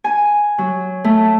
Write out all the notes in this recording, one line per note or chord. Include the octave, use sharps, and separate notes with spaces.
G#5
F#3
A3